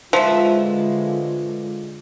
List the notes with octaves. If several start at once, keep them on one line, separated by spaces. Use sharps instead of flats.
D3 F3 G#3 F4 F#4 B4 E5